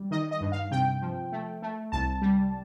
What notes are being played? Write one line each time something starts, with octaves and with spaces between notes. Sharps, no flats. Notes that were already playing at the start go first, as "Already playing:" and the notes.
Already playing: G3
D#3 D#5
D#5
G2
F5
C3 G5
F3
A3
A3
C2 A5
G3